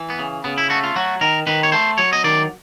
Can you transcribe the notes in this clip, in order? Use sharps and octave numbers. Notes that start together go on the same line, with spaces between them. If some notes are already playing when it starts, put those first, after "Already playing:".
Already playing: E3
B3
C#3
C#3 B3
E4
A3 F#4
F4
F#3 F#4
D#3 A#4
D#3 B4
C#5
A3 C5
F#3 C#5
D#5
D#3 D5